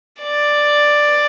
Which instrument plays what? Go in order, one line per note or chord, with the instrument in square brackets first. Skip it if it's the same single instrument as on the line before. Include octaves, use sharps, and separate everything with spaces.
[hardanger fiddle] D5